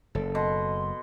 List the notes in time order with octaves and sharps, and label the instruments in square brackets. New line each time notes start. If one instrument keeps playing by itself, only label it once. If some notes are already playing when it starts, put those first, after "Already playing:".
[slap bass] F#1 [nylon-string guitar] A4
[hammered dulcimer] B2 [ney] C6